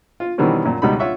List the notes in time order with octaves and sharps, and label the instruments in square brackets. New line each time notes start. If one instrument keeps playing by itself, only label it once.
[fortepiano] F4
B2 D#3 E3 G3 C4 C#4
F#2 A#2
C#2 B2 G3 D#4 B5
F4 C#5 E5 F#5 C#6